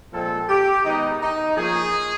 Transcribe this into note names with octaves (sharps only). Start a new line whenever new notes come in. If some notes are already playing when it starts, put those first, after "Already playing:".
A#2 F3 G#3 C4 A4
G4
D#3 G#3 B3 D#4
D#4
F3 A#3 C#4 G#4